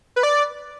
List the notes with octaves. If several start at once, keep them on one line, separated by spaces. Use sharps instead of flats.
B4
D5